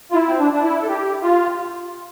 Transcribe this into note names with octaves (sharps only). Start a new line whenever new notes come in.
F4
E4
C4
D4
D4
E4
A4
G4
F4